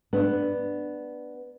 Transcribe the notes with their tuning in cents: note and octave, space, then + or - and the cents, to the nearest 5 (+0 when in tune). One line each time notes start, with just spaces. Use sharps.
B3 +0 D4 +15